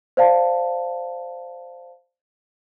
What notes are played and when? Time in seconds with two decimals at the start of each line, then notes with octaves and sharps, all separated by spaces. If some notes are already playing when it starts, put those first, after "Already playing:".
0.17 C5 D5 F5 A5